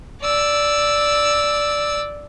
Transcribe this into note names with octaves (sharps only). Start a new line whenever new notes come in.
D5 E6